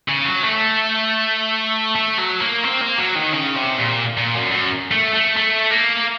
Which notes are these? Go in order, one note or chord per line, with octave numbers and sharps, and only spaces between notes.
C#3
F#3
A3
A3
F#3
A#3
C4
A#3
F#3
D#3
C#3
C3
A#2
A#2
F#2
F#2
A3
A3
A3
A#3